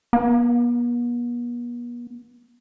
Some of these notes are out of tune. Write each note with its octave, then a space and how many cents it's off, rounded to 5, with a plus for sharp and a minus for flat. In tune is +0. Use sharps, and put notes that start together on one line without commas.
B3 -45